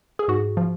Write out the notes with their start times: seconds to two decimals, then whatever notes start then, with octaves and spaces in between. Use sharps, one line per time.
0.19 G#4
0.28 G#2 F#4
0.57 F3